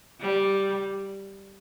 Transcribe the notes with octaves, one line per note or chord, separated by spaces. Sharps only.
G3